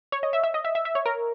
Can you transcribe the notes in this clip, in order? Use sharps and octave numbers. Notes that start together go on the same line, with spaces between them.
C#5
D#5
E5
E5
D#5
E5
E5
E5
C#5
A#4